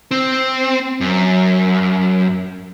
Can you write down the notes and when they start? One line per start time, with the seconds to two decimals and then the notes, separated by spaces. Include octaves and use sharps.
0.11 C4
1.01 F#2